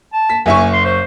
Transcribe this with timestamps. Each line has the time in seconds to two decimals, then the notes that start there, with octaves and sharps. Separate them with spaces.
0.13 A5
0.30 B6
0.46 F#1 E5 G#5 C#6
0.73 C6
0.85 C5